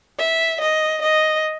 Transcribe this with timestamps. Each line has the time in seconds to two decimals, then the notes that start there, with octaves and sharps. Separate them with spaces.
0.19 E5
0.61 D#5
1.02 D#5